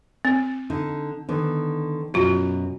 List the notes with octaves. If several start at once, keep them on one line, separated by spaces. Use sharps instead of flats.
C4
D3 D#4
D3 D#3 B3
F#2 B2 F4 F#4